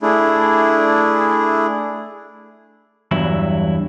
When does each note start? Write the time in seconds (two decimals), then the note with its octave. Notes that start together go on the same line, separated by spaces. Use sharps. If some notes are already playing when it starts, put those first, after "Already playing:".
0.02 A3 D4 E4 G#4
3.11 E2 G2 E3 F#3 E4